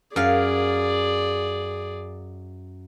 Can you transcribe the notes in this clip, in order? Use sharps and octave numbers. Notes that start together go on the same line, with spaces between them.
F#2 G#4 D5 F5